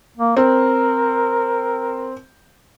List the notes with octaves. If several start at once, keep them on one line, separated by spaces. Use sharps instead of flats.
A#3
C4 A#4